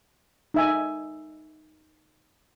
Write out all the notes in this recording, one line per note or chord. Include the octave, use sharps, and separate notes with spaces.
D#4 E5 G#5